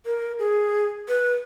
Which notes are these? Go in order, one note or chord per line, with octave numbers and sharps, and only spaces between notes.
A#4
G#4
B4